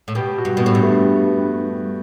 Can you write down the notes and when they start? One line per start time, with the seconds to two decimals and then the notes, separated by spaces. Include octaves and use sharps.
0.08 A2
0.15 B2 G4
0.38 F#4
0.45 G2
0.57 B2 B3
0.66 A2
0.75 G2
0.82 A3